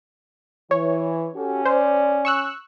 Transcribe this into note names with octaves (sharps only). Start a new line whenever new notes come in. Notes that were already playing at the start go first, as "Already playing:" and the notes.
E3 C#5
C#4 F#4 G4 A4
C5 D5
C#6 E6 F#6